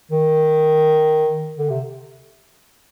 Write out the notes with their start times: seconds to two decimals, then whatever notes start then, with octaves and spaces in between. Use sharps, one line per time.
0.11 D#3
1.58 D3
1.70 C3